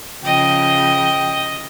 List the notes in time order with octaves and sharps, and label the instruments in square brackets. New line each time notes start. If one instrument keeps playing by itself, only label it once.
[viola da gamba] C#3 F3 [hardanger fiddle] D#5 [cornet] G5